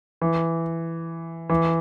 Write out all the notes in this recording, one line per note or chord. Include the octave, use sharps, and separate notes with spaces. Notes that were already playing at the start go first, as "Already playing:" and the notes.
E3
E3